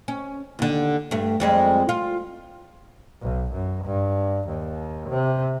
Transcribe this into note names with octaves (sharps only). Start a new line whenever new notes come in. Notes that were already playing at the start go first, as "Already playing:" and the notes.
C#4
D#2 D3
G2 A3
F2 G3 G#3
F4
B1
F#2
G2
D#2
C3